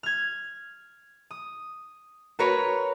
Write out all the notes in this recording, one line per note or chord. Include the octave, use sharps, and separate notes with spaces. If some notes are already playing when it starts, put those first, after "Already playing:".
F6 G#6
D#6
F#4 A#4 B4 C#5